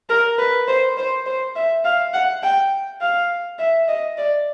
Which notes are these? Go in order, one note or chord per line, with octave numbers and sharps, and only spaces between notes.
A#4
B4
C5
C5
C5
E5
F5
F#5
G5
F5
E5
D#5
D5